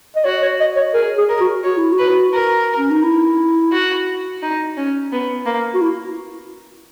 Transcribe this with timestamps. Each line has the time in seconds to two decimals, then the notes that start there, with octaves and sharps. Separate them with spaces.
0.16 D#5
0.24 F#4 C#5
0.42 C#5
0.60 D#5
0.76 C#5
0.94 G#4 A#4
1.18 G#4
1.29 A#4
1.41 F#4
1.63 F#4 C#5
1.77 E4
1.92 F#4
1.99 B4
2.34 A#4
2.77 C#4
2.90 D#4
3.03 E4
3.72 F#4
4.43 D#4
4.77 C#4
5.12 B3
5.46 A#3
5.74 F#4
5.81 E4